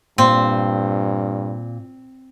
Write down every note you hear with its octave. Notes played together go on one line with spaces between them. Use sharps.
G2 A#2 C4